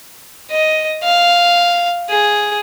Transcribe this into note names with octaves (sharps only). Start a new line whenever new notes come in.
D#5
F5
G#4